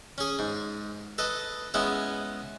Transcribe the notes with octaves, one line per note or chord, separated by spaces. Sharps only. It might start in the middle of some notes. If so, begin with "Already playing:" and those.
C#4 G#4
G#2
A4 B4 D#5
G#3 B3 C#4 E4